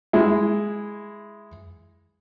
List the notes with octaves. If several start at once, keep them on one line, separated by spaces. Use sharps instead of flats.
G#3 E4